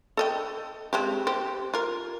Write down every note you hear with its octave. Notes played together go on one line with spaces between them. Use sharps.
A4 D#5 G5
G#3 C4 G4
G4 C5
F4 A#4